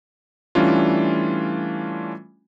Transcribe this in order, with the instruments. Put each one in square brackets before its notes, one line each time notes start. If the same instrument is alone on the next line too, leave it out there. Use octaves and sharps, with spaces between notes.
[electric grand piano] E3 G3 A3 C#4 D4 F4